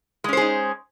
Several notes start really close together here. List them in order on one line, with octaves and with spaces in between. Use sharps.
G#3 C#4 C5 G#4 D#4